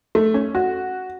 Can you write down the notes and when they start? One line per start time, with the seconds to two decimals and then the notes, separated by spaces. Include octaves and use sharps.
0.15 A3
0.34 C#4
0.55 F#4